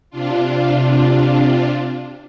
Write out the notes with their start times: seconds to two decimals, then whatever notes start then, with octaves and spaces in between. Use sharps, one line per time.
0.10 C3 D4 F4